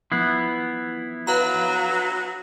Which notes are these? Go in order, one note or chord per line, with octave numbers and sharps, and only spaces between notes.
F3 B3 E4 C7
F#3 B4 F5 A#5